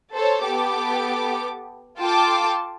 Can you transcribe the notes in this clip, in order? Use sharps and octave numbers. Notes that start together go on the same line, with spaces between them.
A4 C5 C#5
B3 G4 A4 D6
F4 A4 G5 A5 C6 D6